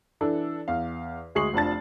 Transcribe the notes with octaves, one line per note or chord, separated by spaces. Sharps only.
E3 D4 A4
E2 F5
D2 G#3 G#4 C#6 C7 F#7
F1 F3 D4 A5 A6